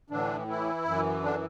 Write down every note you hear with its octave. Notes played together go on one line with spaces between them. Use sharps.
A2 D3 E3 D4
E3 E4
F#2 E3
D3 D4